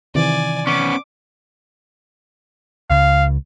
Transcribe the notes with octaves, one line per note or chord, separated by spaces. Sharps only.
C3 D#3 E3 D5 G#5
B3 C#4 D6
C#2 F5